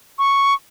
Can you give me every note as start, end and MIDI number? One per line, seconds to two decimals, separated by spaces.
0.19 0.54 85